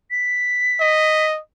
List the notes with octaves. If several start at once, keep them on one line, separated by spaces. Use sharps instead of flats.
B6
D#5